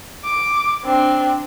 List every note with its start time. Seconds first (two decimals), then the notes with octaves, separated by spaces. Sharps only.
0.24 D6
0.84 C4 D4